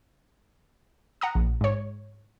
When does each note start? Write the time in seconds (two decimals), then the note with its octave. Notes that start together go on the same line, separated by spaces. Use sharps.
1.21 F#5 A#5 D#6
1.35 A#1
1.61 G#2 C#5